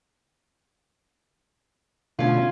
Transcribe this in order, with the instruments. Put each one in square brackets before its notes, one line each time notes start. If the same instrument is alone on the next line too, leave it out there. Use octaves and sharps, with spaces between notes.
[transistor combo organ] B2 D3 A3 [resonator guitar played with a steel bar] C#4 F4